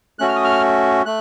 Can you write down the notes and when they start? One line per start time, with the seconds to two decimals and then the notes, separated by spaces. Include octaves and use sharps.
0.19 A3 C#4 F#4 F#6
0.28 F6
0.36 D#6
0.44 F6
1.06 A3 F#6